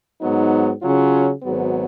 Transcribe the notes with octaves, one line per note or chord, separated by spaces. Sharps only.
G#2 F#3 B3 D#4
C#3 F#3 C#4 F4
G#1 G#2 F#3 B3